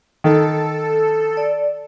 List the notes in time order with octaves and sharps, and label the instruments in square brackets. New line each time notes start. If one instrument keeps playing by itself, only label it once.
[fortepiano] D#3 [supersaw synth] A4
[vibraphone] D5